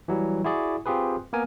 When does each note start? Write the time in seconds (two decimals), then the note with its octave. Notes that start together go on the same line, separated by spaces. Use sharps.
0.08 E3 F#3 G3
0.44 E4 F#4 G#4 D5
0.86 C4 F4 G4 G#4 B4
1.33 A#3 B3 A#4 G#5